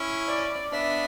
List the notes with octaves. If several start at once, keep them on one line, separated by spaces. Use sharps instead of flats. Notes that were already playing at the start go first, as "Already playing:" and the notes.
Already playing: C#4 E4
D5
B3 D4 E5